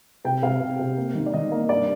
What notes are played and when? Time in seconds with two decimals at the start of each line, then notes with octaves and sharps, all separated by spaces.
0.24 C3 G5
0.43 C3 F5
0.61 C3
0.79 C3
0.97 A#3
1.15 D#3
1.26 D5
1.34 D#3 D#5
1.51 A#3
1.69 G2 D5